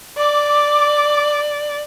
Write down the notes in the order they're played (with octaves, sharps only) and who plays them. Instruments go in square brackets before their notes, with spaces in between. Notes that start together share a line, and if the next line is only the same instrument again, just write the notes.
[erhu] D5 [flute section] D6